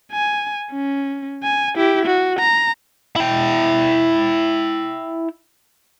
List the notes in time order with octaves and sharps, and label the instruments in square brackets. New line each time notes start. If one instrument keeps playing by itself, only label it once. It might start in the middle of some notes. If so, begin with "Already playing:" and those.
[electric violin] G#5
C#4
G#5
E4 G4
F#4
A#5
[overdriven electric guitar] E4 G5